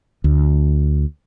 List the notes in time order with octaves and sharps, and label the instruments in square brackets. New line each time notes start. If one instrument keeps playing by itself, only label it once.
[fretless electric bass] D2